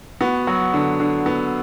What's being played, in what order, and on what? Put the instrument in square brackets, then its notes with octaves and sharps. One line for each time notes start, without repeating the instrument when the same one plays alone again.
[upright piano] B3 [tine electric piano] F#4
[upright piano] F#3 [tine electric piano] F#4
[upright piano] D3
D3
B3